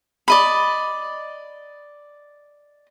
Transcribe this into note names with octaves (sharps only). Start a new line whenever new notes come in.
D5 D#5 B5